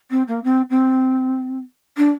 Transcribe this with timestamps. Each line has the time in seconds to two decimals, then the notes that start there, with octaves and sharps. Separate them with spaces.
0.11 C4
0.27 A#3
0.44 C4
0.70 C4
1.97 D4